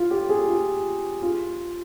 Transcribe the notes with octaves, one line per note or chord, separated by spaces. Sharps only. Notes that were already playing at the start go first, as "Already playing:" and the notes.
Already playing: F4
G4
G#4
F4
F4